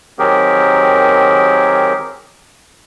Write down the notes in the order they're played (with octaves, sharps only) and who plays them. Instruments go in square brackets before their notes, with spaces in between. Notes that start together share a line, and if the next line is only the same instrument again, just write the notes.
[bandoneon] D#3 F#3 C4 G4 G#4 A#4